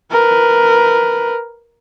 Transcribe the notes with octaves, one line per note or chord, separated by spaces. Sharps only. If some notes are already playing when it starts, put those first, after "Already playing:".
A#4 B4